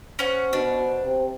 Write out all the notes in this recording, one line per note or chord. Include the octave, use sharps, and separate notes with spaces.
C#4 C5 F#5
B2 D4
C3